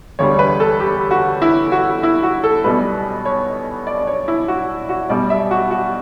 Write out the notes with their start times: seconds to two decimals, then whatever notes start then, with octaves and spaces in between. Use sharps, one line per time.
0.19 E1 D2 D3 G3 C#5
0.39 B4
0.60 A4
0.80 G4
1.11 F#4
1.42 E4
1.72 F#4
2.03 E4
2.23 F#4
2.44 A4
2.64 B1 B2 G3 B4
3.25 C#5
3.87 D5
3.98 D5
4.07 C#5
4.28 E4
4.48 F#4
4.89 F#4
5.10 B1 B2 G3 D5
5.30 E5
5.51 F#4
5.71 F#4